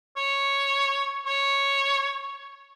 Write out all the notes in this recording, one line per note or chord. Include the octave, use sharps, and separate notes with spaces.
C#5
C#5